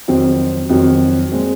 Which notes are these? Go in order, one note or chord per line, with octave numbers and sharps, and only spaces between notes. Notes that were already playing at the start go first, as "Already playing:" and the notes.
F2 D#3 F#3 C4
F2 D#3 F#3 C4
A#2 G#3 C4